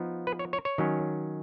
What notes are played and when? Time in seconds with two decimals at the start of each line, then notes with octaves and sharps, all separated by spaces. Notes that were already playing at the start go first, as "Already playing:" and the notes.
Already playing: F3 B3 D#4
0.27 B4
0.39 C#5
0.53 C#5
0.65 C#5
0.78 D#3 F#3 C#4